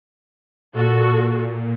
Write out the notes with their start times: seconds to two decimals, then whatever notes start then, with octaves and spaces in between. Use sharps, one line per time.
0.74 A#2 F#4 A4